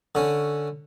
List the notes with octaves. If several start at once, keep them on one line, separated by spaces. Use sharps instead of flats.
D3 C#4